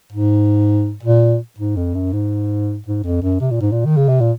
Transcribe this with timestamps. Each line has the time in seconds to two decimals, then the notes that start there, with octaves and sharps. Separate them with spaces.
0.12 G#2
1.03 A#2
1.58 G#2
1.76 F2
1.94 F#2
2.13 G#2
2.86 G#2
3.04 F2
3.22 F#2
3.40 C3
3.51 A#2
3.61 G#2
3.71 A#2
3.85 D#3
3.97 C#3
4.08 C3
4.20 A#2